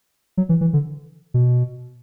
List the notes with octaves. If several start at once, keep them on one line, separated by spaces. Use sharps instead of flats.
F#3
E3
E3
D3
B2